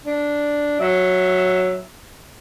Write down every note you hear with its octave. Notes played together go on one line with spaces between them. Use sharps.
D4
F#3 E5